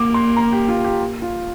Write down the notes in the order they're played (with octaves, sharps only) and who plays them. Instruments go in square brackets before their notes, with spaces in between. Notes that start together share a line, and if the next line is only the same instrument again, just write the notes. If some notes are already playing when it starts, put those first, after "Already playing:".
Already playing: [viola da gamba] A#3 [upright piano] D6
[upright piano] C6
A#5
G4
F4
G4
F4